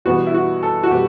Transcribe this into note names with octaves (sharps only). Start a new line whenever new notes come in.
E2 B2 G3 B3 F#4
E4
F#4
A4
F#4
B2 G3 B3 G4